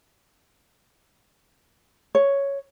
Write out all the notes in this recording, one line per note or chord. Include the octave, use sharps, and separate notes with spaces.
C#5